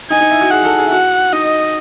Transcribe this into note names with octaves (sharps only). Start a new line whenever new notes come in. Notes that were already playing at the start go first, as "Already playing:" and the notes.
D#4 G#5
D#4
E4
F#4
G#4 F#5
A4
G#4
E4
F#4 F#5
D#4 D#5